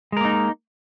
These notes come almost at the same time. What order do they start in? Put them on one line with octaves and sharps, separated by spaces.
G#3 A#4 A#3 D#4